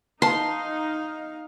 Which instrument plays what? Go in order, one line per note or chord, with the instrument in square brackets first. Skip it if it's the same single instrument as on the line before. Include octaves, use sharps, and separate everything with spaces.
[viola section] D#4 [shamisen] B4 A5 [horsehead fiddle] F5 [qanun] C6